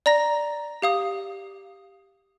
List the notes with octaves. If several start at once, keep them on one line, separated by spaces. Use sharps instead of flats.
D5 A#5 A#6
G4 F5 D#6